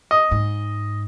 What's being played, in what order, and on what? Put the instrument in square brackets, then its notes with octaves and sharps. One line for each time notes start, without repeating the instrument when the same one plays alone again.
[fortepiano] D#5
[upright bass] G#2